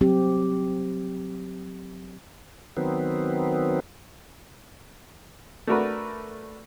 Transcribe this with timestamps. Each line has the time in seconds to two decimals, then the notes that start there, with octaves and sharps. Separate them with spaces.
0.01 F#3 C4 G4
2.77 D#3 F#3 B3 C4
5.67 A3 D4 F#4 A#4 B4